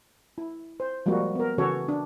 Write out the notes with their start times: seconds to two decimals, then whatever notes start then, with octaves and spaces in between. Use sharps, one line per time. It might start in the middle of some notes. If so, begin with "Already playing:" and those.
0.38 E4
0.80 C5
1.06 F3 G3 G#3 A#3 F#4
1.35 B3 A#4
1.58 C#3 E3 C#4 F#4 A4 C#5
1.88 D4